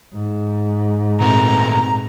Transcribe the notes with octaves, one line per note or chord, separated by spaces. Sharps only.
G#2
A#2 A3 C4 A#5